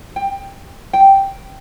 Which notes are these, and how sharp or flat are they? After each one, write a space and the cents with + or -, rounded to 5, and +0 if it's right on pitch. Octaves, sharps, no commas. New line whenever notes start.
G5 +20
G5 -5